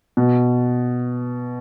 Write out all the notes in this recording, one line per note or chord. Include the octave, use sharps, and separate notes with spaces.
B2